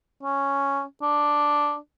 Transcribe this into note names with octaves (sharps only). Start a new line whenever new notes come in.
C#4
D4